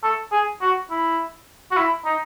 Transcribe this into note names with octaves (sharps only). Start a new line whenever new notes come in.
A4
G#4
F#4
E4
F#4
E4
D#4